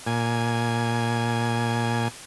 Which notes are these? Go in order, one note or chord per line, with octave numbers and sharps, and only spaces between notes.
A#2 G#5